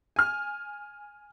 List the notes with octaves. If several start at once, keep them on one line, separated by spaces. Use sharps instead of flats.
G#5 F6